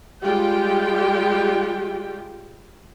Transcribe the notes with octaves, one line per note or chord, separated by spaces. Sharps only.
G3 G#3 F4 G4 G5